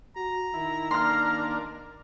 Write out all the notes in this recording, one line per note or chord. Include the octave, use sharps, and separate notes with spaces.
F#4 A#5
D#3 E4
A#3 D4 A#4 C6 F6